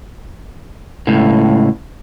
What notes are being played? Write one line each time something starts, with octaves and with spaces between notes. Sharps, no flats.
C#2 A2